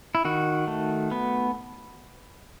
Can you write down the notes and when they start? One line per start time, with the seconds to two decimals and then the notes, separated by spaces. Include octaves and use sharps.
0.15 E4
0.25 D#3 F#4
0.68 A3
1.11 B3